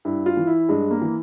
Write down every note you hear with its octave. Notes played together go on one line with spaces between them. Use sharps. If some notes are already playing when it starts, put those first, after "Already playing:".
G2 E4
F4
E3
E4
G2 G#3
A#3
E3